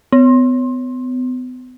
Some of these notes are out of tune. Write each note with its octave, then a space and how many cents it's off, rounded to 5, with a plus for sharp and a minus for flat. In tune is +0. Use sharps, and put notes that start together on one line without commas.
B3 +40